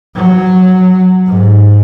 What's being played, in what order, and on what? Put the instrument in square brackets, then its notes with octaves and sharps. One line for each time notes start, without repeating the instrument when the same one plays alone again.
[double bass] F#3
G#2